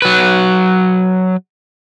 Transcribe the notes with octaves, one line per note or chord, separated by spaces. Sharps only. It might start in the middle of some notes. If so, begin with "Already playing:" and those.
F#3 B4